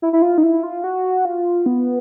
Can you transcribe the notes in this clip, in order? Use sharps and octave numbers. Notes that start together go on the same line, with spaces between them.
E4
E4
F4
D#4
E4
F4
F#4
F4
B3